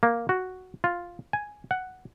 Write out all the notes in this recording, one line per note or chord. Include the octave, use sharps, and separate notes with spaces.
A#3
F#4
F4
G#5
F#5